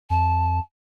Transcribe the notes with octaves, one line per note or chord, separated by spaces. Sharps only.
F2 A5